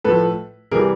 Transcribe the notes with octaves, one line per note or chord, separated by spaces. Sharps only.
A2 F3 A4 B4
C3 E3 G3 G#4 A#4